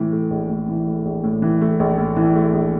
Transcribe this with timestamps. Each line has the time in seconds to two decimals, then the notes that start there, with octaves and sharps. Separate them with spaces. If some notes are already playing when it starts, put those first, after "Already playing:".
Already playing: A2 E3
0.12 A3
0.31 A#1
0.50 A2
0.68 E3
0.87 A3
1.05 A#1
1.24 A2
1.42 E3
1.61 A3
1.80 A#1
1.98 A2
2.16 E3
2.36 A3
2.53 A#1